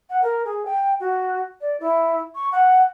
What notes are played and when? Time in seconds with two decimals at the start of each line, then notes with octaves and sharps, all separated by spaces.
0.10 F#5
0.22 A#4
0.45 G#4
0.66 G5
1.00 F#4
1.61 D5
1.80 E4
2.35 C#6
2.52 F#5